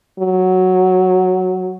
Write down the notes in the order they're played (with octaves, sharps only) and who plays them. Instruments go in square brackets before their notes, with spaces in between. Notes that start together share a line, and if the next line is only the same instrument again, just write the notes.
[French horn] F#3